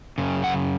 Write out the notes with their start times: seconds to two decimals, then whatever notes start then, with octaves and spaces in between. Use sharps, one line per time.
0.18 F#2 C#3
0.44 F#5